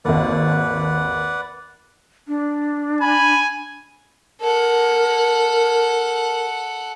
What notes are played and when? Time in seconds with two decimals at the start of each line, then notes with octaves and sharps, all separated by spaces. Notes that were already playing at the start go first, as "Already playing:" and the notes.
0.05 G#1 D#2 B4 D5 F#5
2.28 D4
3.01 G#5 B5
4.41 A4 A#4 F#5